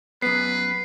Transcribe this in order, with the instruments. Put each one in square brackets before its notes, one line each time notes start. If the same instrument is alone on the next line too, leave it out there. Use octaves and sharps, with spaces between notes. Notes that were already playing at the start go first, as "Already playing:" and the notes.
[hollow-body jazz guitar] F#2 B3 [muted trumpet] B4 [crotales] C7